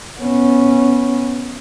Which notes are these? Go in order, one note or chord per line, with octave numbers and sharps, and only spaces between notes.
B3 C#4